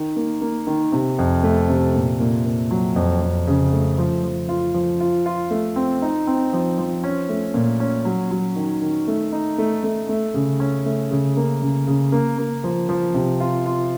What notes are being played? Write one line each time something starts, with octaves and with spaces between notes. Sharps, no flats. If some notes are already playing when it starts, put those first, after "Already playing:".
Already playing: D#3
A#3
A#3
D#3
C3
F2
A3
C3
A#2
A#2
A#2
F#3
F2
F2
C#3
A3
F3
F3
F4
F3
F4
F4
A3
C4
D#4
C4
F3
F3
C#4
A3
A#2
C#4
F#3
F#3
D#3
D#3
A3
D#4
A3
A3
A3
C#3
C#4
A3
C#3
A#3
C#3
C#3
A#3
A#3
F3
F3
C3
F4
F4